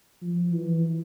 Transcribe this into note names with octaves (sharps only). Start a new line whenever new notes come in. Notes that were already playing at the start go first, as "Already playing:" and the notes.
F3
E3